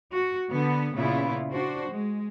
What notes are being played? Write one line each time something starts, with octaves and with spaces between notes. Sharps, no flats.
F#4
D3 B3
A#2 C#3 B3 E4 F4
D4 F#4 C5
G#3